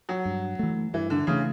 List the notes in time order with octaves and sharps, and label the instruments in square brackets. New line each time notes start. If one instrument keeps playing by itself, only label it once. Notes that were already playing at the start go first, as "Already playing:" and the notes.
[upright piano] F#3
[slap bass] G2
E3 A3
[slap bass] G2 [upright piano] E3
[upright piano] D3
[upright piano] C#3 [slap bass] E3 A3